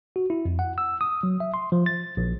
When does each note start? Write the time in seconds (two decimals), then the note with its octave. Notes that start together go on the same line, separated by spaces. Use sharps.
0.16 F#4
0.30 E4
0.45 F2
0.59 F#5
0.78 E6
1.01 D#6
1.23 F#3
1.40 E5
1.54 C6
1.72 F3
1.86 A6
2.17 A#1